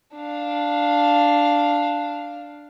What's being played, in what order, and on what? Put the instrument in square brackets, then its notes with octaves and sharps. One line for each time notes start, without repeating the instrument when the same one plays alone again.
[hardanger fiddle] D4 F5